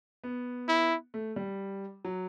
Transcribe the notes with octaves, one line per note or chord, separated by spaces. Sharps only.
B3
E4
A3
G3
F#3